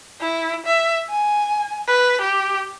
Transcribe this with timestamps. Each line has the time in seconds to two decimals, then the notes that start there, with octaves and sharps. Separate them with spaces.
0.21 E4
0.66 E5
1.10 G#5
1.87 B4
2.21 G4